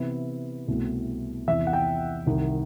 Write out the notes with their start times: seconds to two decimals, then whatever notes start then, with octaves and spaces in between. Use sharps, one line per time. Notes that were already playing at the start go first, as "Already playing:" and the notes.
Already playing: C3 E3 B3 E4
0.68 C2 B2 A3 C4 E4
1.48 E2 C3 E3 E5
1.67 F#5
1.73 G5
2.26 C2 C3 D#3